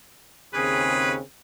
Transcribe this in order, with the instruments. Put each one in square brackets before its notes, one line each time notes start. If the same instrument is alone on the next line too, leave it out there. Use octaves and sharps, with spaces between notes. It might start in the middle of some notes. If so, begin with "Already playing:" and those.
[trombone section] D#2 C#3 C4 [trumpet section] C#4 B4 [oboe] G#4